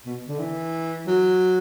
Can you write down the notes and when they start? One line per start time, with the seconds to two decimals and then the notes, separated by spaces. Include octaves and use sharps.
0.06 B2
0.28 D3
0.39 E3
1.07 F#3